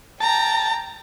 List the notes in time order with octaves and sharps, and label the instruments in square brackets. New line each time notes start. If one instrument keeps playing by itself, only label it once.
[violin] G5 A#5 [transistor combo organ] A5